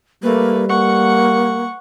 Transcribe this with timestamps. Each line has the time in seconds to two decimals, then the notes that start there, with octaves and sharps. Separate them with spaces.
0.23 G3 A3 A#3 B4
0.69 A#3 F#5 C#6